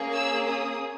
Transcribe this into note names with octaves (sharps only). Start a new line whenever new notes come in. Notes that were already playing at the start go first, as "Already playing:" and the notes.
Already playing: A#3 C#4 G#4
E6
D#6